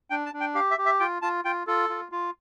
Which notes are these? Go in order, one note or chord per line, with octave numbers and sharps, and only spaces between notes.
D4 G5
A5
D4
G5
G4 F5
E5
G4
E5
F4 G5
F4 A5
F4 G5
F4 A4
F4
F4